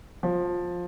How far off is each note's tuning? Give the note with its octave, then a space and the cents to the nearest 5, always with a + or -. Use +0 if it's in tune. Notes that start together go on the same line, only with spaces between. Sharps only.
F3 +15